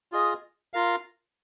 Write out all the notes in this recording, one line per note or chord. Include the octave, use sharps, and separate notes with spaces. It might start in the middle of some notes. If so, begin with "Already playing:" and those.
F4 G#4 D#5
F4 A#4 F5